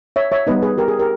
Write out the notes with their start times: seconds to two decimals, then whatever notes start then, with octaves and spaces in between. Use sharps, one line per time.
0.16 C#5 E5
0.32 C#5 E5
0.47 G3 B3 D#4 B4 D#5
0.62 G#4 B4
0.78 G4 A#4
0.88 G#4
0.99 G4 A#4